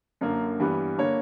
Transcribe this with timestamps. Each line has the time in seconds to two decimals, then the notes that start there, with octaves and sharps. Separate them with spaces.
0.21 F#2 D3 A#3
0.59 G2 E3 G3 B3
0.98 D3 A#3 C#5